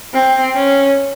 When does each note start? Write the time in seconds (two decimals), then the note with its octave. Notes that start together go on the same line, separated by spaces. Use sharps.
0.13 C4
0.55 C#4